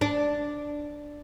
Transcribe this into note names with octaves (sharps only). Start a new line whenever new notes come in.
D4